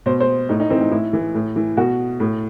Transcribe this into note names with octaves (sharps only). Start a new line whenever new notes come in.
B2 C5
C5
A2 D#4
D#4
E3 C4
D#4
A2 E4
E3
A2
E3
B2 F#4
A2